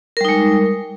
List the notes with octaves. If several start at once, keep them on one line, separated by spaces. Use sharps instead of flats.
G3 G#3 D#4 A#4